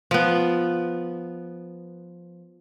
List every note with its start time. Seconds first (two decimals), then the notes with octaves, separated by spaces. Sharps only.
0.11 F3 B3